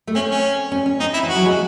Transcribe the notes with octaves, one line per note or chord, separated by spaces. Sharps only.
A3
C4 C#4
C#4
C#4
C#4
C4 D#4
E4
E3
F#4
F#3
G#3